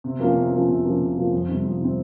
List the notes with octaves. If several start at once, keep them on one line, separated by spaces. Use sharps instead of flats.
C3
F3 A#3 C#4
C3
F3 A#3 C#4
C3
F3 A#3 C#4
C3
F3 A#3 C#4
F2
C3 D#3 G3 C4
F2
C3 D#3 G3 C4